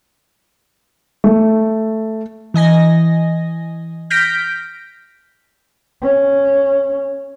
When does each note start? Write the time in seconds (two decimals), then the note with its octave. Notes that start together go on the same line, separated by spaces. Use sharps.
1.24 A3
2.54 E3 D#5 G#5 A#6
4.10 F6 G6 A#6 B6 D7
6.02 C#4